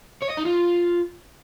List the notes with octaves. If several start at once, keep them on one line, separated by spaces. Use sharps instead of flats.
C#5
D#5
D#4
F4